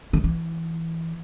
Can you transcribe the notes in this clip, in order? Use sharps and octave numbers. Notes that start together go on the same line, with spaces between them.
D#3
E3